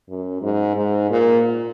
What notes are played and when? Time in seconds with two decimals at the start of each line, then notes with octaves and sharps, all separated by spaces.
0.09 F#2
0.42 G#2
0.77 G#2
1.10 A#2